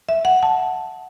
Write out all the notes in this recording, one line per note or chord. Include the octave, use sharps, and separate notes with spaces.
E5
F#5
A5